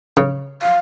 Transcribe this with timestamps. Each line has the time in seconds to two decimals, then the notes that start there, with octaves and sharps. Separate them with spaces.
0.17 C#3
0.62 F5